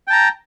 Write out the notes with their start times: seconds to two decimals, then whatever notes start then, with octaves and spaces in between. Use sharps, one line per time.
0.07 G5
0.10 A5
0.13 A#5